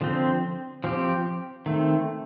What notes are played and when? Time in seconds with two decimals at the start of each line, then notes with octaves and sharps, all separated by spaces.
0.01 D3 F3 C4
0.84 F3 C4 G4
1.66 D#3 A3 C4